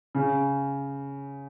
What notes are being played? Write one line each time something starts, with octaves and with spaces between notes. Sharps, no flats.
C#3